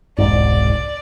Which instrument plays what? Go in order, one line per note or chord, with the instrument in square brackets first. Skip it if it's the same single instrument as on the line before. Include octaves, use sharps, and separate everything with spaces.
[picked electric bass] E1 C2 G#2 [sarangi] D5